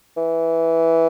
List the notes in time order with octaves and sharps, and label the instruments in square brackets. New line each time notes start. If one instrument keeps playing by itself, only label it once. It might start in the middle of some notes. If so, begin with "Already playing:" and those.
[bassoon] E3